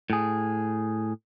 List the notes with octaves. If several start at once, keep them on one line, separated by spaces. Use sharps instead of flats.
A2 G#4